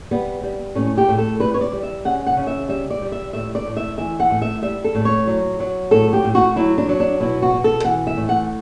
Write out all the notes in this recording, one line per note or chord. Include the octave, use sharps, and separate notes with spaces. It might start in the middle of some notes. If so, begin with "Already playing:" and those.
G3 B3
G3
A2 C#4
G4
A2
A4
G3 B4
C#5
D5
G3
E5
C#3 F#5
F#5
C#3
E5
G3 E5
D5
G3
E5
A2 E5
D5
A2
E5
E3 E5
F#5
A2
E5
G3 E5
A4
A2
C#5
F#3
F#3
A2 A4
G4
A2
F#4
F#3 E4
D4
F#3
D4
B2 E4
F#4
B2
A4
E3 F#5
E5
A2
F#5